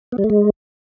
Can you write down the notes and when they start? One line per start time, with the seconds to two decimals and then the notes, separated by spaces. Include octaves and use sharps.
0.12 B3
0.18 G3
0.24 A3
0.30 G#3